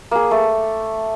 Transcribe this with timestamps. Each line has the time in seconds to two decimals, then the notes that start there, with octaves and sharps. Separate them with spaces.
0.11 A#3 G#4
0.31 A3